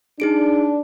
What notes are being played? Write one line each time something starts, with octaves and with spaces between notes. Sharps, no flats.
D4 D#4 G#4 D7